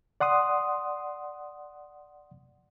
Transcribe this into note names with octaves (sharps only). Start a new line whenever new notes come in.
D5 F#5 C6 D#6